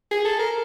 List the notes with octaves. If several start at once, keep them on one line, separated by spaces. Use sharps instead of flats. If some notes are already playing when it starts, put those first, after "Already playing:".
G#4
A4
A#4